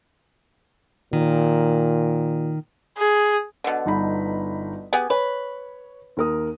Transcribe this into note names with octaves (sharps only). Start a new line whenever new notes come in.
A#2 D#3
G#4
B2 D3
G1 D#4 B5
B3 G4 G#4 G#5
B4 C#5
D#2 A#4 D#6